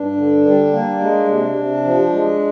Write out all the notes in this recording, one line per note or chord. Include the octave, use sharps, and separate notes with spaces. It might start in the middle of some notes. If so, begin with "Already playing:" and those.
Already playing: G2 D4
D3
G3
A#3
G#3
C3
C3
F3
G#3